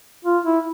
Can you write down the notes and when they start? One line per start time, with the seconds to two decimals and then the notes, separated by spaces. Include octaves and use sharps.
0.25 F4
0.45 E4